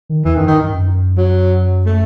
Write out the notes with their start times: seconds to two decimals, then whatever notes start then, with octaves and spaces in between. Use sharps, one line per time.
0.09 D#3
0.25 E2 E3
0.36 F#2 D#3
0.48 G2 D#3
0.59 G2
0.71 F#2
1.17 F#3
1.86 A3